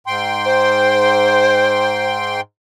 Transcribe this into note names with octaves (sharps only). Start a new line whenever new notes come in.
G#2 G5 C6
C5